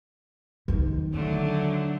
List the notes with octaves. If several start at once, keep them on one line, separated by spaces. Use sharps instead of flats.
D#3 D#4
D3 F#3 A3